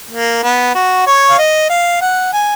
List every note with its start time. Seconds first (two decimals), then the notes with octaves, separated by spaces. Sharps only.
0.11 A#3
0.43 B3
0.75 F#4
1.06 C#5
1.29 F5
1.38 D#5
1.69 F5
2.01 F#5
2.33 G#5